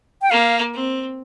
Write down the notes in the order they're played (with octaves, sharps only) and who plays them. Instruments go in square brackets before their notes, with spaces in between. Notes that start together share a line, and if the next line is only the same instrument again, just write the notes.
[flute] G5
[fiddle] A#3 [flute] F5
[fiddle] C4